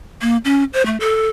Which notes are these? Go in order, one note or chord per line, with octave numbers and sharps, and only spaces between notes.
A#3
C#4
C5
A3
A4